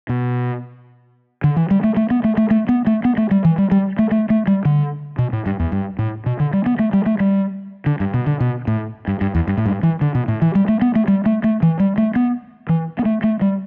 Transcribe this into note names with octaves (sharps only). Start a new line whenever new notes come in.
B2
D3
E3
G3
A3
A3
B3
A3
A3
A3
B3
A3
B3
A3
G3
E3
G3
G3
A3
A3
A3
G3
D3
B2
A2
G2
E2
G2
A2
B2
D3
G3
B3
A3
G3
A3
G3
D3
G2
B2
D3
B2
A2
G2
G2
E2
G2
A2
G2
E3
D3
B2
A2
E3
G3
A3
B3
A3
G3
A3
A3
E3
G3
A3
B3
E3
B3
A3
A3
G3